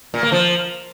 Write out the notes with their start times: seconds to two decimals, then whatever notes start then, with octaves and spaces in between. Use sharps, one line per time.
0.14 A#2
0.23 A#3
0.32 F3